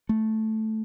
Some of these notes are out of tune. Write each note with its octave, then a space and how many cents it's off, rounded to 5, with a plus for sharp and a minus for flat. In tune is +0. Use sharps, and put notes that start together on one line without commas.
A3 -5